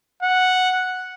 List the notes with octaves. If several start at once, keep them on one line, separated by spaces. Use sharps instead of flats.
F#5